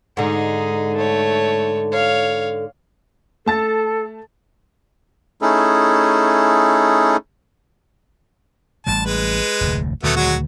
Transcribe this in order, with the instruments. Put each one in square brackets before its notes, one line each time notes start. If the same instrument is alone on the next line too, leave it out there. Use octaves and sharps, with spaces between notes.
[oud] G#2 D3 [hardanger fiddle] D#4 G#4
[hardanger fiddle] A3 C#5
C#5 F5
[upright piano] A3 A5 A6 [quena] A4
[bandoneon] A3 C#4 D#4 E4 G#4 A4
[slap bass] A1 A2 G3 [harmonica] A5
[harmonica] G#3 B4
[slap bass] F1 D2 A2
[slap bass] D2 A#2 D#3 [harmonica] F#3 A3 B3
[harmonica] F#3 G#3 F#4